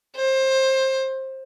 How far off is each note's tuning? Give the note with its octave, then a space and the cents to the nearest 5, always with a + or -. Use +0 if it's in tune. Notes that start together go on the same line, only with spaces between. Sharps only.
C5 +20